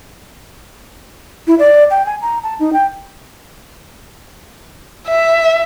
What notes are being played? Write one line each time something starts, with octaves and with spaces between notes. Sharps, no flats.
E4
D5
G5
G#5
A#5
A5
D#4
G5
E5